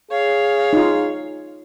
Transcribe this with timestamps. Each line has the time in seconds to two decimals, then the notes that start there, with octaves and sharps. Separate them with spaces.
0.11 G#4 C#5 F5
0.73 D#4 F4